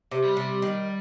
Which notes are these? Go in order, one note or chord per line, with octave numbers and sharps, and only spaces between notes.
C3
G3
C3
D#3